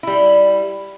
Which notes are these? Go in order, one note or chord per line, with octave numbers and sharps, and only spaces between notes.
G3 E4